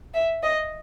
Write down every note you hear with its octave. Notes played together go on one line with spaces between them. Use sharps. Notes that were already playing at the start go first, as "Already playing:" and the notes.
E5
D#5